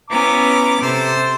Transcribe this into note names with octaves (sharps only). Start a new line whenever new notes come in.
B3 C#4 E4 A#5 D6
C3 A4 C5